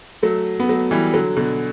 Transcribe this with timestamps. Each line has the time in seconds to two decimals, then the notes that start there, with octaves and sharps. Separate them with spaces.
0.23 F#3 A3
0.60 B3
0.69 F#3 A3
0.91 E3 G3
1.14 D3 F#3
1.36 B2 D3